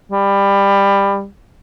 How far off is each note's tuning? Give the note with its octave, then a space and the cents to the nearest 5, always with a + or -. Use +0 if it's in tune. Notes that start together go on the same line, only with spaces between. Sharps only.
G3 +20